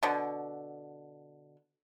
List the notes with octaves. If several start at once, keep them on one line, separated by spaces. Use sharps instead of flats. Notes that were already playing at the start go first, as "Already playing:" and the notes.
B2 D3